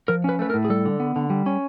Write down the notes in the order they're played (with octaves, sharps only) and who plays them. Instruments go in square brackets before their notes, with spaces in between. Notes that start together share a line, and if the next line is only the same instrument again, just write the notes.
[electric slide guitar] F3 A#4
C#4 B4
A3 B4
A#4
A2
G#4
G3 A4
D3
B3
D3
G3
C#4